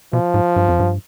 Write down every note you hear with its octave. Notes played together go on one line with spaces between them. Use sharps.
B2 F3
G#2
G2
F2
G2